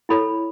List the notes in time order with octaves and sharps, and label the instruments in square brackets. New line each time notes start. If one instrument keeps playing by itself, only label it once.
[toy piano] E4 A4 C#5 B5